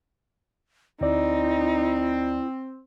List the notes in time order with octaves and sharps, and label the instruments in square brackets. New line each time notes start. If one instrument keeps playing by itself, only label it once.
[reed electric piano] D2 D5 [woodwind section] C4 [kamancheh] D#4 [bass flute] E4